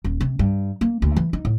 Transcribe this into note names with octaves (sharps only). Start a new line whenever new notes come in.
D#1
C3
G2
A#3
D2
E3
D#4
A2